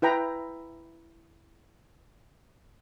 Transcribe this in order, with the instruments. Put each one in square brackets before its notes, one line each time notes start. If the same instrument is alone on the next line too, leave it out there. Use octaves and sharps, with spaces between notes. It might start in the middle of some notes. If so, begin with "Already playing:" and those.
[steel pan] E4 B4 G5 A#5